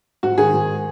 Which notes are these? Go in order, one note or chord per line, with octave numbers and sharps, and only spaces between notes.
G#2 F#4
D#3 G#4
G#2